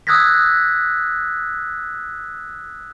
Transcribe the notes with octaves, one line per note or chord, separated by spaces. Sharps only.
D#6 E6 F#6 G#6 A#6 B6